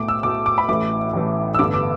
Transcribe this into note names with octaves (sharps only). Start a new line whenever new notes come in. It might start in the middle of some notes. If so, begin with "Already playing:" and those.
Already playing: B1 A2 A3 D6
E6
B1 A2 A3 D6
D6
B5
A1 A2 E3 A3 D6
A1 A2 E3 A3
E6
A1 G2 D3 B3 D6
D6